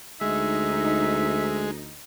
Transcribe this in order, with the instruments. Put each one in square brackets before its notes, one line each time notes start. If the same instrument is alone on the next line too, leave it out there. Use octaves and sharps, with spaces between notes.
[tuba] D2 [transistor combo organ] G#3 [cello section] D#4 [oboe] E5